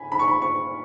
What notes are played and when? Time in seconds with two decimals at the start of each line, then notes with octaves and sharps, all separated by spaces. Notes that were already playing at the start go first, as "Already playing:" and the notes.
Already playing: G#5 B5
0.12 B5
0.19 C#6
0.28 B5
0.42 C#6